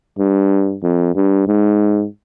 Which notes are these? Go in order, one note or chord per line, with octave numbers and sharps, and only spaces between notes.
G2
F2
G2
G#2